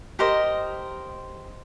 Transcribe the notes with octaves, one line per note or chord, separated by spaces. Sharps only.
G4 A#4 C5 D#5